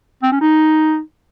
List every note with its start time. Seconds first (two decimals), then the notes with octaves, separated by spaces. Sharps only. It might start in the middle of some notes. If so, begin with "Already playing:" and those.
0.23 C4
0.32 C#4
0.41 D#4